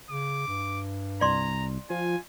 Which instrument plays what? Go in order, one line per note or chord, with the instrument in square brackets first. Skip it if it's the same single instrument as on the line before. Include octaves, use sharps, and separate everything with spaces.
[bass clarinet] C#3 [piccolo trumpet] D6
[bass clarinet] G2
[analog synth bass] C2 [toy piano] D5 C6 [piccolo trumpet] A#5
[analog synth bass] F3 [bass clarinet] F4 [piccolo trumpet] G#5